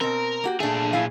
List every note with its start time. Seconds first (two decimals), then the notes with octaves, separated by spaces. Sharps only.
0.01 B2 C4 A#4
0.44 A#3 F#4 G4
0.60 A#2 A3 D4 G#4
0.93 E4 D5 F5